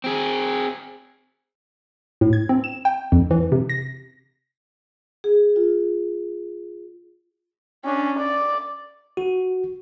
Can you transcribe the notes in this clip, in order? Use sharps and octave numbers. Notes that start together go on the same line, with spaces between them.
C4 G#4
A2
G#6
C4
E7
G5
F2
E3
C3
A#6
G#4
F4
C#4 D4
D5
F#4